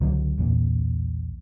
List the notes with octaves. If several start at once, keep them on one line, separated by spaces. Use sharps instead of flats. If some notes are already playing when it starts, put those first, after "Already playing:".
C#2 D3 F#3
B1 E2 A#2